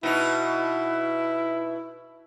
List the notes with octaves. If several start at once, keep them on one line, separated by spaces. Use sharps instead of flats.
B2 D#4 E4